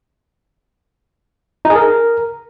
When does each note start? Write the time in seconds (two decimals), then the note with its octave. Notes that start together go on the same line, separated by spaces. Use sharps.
1.65 D#4
1.70 G#4
1.75 A#4